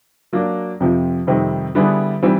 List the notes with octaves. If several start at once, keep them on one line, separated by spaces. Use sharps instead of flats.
F#3 A#3 D4
F2 C3 F3
F2 C3 D#3 G3 C4
D3 G3 B3 E4 G#4
E3 G3 C4